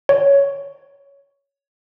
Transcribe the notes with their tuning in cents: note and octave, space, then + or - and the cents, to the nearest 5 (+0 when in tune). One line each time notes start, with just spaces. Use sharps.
C#5 +10